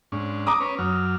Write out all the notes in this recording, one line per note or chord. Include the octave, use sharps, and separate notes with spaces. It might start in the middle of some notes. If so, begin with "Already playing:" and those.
G#2 C#4 D4
A#5 D6 D#6
C#4 B4 C#5
F#2 F#3 F6